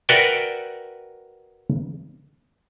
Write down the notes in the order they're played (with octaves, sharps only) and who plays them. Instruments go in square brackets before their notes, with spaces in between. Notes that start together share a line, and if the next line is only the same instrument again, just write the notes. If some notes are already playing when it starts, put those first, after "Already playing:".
[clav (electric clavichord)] F#4 A#4 B4 D5 E5 G5